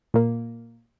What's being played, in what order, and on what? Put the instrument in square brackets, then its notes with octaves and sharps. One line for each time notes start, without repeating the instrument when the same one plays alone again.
[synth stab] A#2 A#3